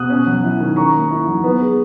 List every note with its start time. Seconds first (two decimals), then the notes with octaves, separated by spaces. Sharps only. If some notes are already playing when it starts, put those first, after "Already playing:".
Already playing: B2 D#6 F#6
0.10 C#4
0.27 F#3
0.44 E4
0.60 D#3
0.76 C#4 A#5 C#6
0.94 A#3
1.11 E4
1.27 F#3
1.44 B3
1.61 G#3